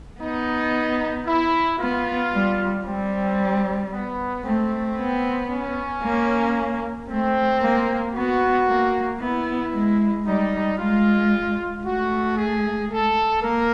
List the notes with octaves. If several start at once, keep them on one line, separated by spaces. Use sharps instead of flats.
B3 D#4
E4
B3 F4
G3
G3 C4
B3
A3 C4
B3
C#4
A#3
A3 C4
A#3
B3 F#4
A#3
B3 E4
G#3
G3 D#4
G#3 F4
A3 F#4
G#4
A4
A#3 A#4